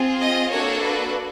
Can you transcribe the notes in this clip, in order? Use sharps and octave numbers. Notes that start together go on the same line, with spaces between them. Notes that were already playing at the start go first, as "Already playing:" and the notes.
Already playing: C4 F4 G#4
D#5
A#3 D4 F#4 A4 C#5
B4